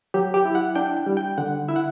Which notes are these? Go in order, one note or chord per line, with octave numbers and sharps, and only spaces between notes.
F#3 G4
G4
E4
F#5
D4 G5
G5
G3
G5
D3 F#5
E4 E5
F#5